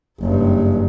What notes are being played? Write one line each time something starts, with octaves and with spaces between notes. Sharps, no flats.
F#1 G2